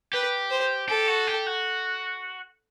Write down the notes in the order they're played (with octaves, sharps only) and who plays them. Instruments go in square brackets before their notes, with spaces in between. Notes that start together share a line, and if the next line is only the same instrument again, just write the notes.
[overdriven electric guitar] G4 [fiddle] B4
[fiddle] C5
[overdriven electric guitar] G4 [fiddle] A4
[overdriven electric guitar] F#4
G4
F#4